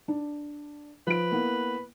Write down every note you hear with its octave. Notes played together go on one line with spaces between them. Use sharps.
D4
F3 B4 D7
A#3 B3 E4